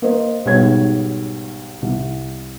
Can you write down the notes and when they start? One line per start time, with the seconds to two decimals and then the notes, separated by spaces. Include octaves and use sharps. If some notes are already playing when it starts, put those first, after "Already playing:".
0.02 A#3 A#4 C5 D#5
0.45 B1 G#2 G3 B3 C#5 G#6
1.82 C2